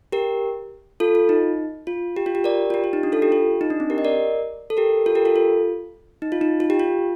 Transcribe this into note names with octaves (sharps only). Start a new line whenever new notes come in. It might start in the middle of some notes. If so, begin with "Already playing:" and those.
G4 A#4
F4 A4
F4
D#4
F4
G4
F4
G4
A#4 D5
F4
G4
F4
D#4
D4
F4 A4
G4
F4
D#4
D4
C4
G4 A#4
D#5
A#4 D5
A4
G4 A#4
F4 A4
G4 A#4
F4 A4
F4
D#4
F4
D#4
F4
G4
F4